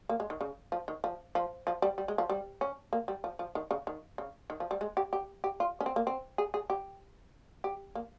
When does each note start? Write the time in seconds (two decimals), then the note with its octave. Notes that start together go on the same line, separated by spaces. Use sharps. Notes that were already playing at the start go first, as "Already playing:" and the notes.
0.09 A#3
0.20 G#3
0.30 D#3
0.41 C#3
0.72 F3
0.88 D#3
1.04 F3
1.35 F3
1.67 F3
1.82 G3
1.98 G3
2.08 G#3
2.18 F3
2.30 G3
2.61 C#4
2.93 A#3
3.08 G3
3.24 F3
3.39 F3
3.55 D#3
3.71 C#3
3.87 D#3
4.18 C#3
4.50 D#3
4.60 F3
4.71 G3
4.81 G#3
4.97 G4
5.13 G4
5.44 G4
5.60 F4
5.81 C#4
5.86 C4
5.96 A#3
6.07 C4
6.38 G#4
6.54 G#4
6.70 G4
7.64 G4
7.95 A#3